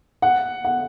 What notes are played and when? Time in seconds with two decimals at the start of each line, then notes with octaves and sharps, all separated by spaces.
0.22 F#5
0.65 F#5